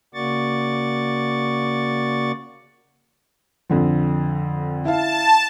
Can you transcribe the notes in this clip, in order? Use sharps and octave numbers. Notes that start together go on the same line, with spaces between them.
C#3 A#3 F#4 D5 C#6 A6
F2 D3 F3
E4 F5 A5